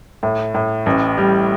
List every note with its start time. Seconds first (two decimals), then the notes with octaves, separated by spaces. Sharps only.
0.23 A2
0.54 A2
0.86 A1
1.18 G3